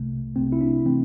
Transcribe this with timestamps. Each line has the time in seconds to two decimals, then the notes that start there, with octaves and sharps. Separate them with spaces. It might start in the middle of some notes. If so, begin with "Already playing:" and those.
Already playing: C2 C3 A3
0.36 C2 C3 A3 C4
0.52 E4
0.61 D4
0.85 E3 A3 C4